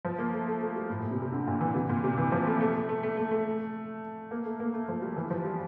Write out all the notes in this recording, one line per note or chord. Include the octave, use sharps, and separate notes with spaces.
F3
A#3
A3
A3
A3
G3
A2
A#2
C3
C3
D3
A#2
E3
C3
A#2
C3
E3
F3
A3
A3
A3
A3
A3
A3
A3
A#3
A3
A#3
A3
F3
G3
E3
F3
G3